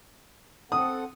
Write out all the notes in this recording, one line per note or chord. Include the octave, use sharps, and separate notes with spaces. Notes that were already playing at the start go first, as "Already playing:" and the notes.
C4 A4 F#5 D#6